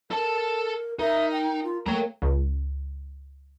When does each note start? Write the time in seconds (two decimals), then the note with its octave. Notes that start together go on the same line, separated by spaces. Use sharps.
0.11 A4 A#4 A5
0.99 D#4 A#4 E5
1.32 G5
1.64 F4
1.86 A3 A#3 C#5 G5 A#5
2.22 C#2